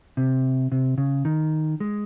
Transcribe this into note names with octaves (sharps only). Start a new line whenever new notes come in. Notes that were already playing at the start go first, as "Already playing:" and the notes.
C3
C3
C#3
D#3
G#3